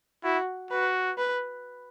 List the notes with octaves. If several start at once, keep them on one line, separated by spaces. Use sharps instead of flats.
E4 F#4
F#4 B4
B4